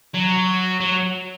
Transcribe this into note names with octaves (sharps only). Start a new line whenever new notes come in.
F#3
F#3